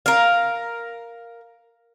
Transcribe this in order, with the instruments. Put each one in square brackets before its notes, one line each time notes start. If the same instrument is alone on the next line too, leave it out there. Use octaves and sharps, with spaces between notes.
[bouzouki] A#4 F5